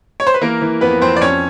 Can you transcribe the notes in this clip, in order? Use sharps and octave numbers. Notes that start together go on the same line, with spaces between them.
C#5
C5
B4
E3 A#3 A#4
E3
F2 B3 B4
F2 C4 C5
D5
F2 C#4 C#5